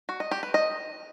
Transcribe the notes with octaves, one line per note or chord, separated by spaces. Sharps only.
F#4
D#5
G4
B4
D#5